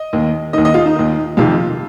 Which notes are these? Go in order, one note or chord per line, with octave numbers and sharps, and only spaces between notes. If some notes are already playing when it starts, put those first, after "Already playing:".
Already playing: D#5
D#2 D#3
D#2 D#3 D#5
D#5
F4
D#4
D#2 D#3
F2 C3 D#3 F4